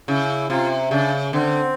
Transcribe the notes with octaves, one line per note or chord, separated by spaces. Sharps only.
C#3 E4
C3 F4
C#3 D4
D3 C4